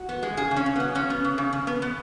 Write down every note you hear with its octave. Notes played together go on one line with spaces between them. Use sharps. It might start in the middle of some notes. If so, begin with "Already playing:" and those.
Already playing: F#4
B3
G#3
C#3 G#4
C#3
C#4
C#3
F#3 B3
C#3 C#4
B3
C#3
C#3
C#3
B3
B3